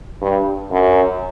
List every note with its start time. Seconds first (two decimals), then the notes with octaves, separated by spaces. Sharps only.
0.22 G2
0.71 F#2